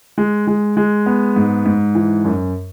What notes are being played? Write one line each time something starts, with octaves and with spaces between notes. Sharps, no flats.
G#3
G#3
G#3
B3
G#2
G#2
E3
F#2